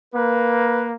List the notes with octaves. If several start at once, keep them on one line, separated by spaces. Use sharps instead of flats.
A#3 B4